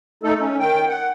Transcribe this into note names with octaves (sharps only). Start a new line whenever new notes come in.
A3 D#4 A4
C#4
D#3 G5
F#5